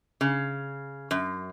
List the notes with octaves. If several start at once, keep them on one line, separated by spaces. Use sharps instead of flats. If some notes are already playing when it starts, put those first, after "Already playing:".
C#3
F#2